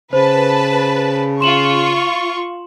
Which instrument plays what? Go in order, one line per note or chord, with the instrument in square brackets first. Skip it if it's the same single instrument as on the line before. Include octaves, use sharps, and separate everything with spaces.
[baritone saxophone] C#3 [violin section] B4 A5 [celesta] C5
[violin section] F4 C#6 [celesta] C6 E7 F#7